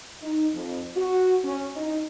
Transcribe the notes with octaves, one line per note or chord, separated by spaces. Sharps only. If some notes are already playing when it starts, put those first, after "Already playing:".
D#4
F2
F#4
C#4
D#4